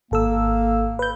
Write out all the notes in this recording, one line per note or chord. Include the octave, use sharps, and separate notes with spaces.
G#1 A#3 A4 E6
B4 G6